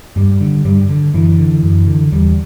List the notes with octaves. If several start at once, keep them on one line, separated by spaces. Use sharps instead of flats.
G2 G3
D3
G2 G3
D3
F#2 E3
D3
F#2
D3
E2 G3